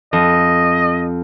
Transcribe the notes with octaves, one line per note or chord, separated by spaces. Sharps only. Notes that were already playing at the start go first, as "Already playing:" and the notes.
F2 D#5